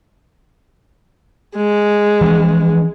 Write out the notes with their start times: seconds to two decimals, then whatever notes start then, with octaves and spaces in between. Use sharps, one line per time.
1.57 G#3
2.21 E3 F3 C#4